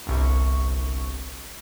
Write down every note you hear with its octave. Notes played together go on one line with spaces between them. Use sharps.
G1 C2 C#6